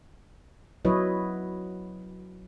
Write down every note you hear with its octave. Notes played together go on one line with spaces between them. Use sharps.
F#3 E4 B4 C#5 D#5